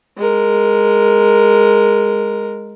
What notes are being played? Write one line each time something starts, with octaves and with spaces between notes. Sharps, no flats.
G#3 A#4